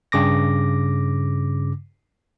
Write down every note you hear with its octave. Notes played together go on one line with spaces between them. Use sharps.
G2 C#3 D6 A#6